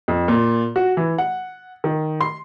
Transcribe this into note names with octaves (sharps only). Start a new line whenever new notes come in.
F2
A#2
F#4
E3
F#5
D#3
C6